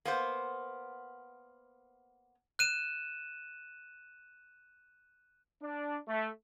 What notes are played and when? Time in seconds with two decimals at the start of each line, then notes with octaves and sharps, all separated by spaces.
0.05 A#3 B3 C5
2.59 F#6 D#7 E7
5.63 D4
6.08 A3